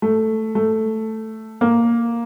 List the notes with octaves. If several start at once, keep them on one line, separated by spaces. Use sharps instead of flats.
A3
A3
A#3